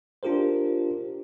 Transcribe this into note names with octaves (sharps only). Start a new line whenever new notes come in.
D4 F4 G4 A#4 C5